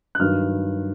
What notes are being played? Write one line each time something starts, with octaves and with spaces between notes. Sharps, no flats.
F#6
G2 D#3 F#3 F6